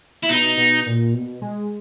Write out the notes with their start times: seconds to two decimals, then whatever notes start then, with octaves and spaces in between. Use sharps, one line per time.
0.24 E4
0.30 B2 D#4
0.57 B2
0.86 A#2
1.14 B2
1.42 G#3